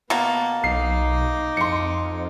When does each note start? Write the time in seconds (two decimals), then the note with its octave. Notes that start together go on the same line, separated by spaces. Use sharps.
0.10 B2 A#3 B3 A5
0.64 B1 D#4 D6 C7
1.57 F2 C6 C#7